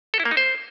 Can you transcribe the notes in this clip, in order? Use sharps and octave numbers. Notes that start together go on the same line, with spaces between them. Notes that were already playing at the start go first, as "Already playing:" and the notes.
A4
E4
A#3
D#4
C5